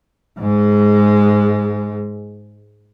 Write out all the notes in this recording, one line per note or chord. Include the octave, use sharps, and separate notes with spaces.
G#2 G#3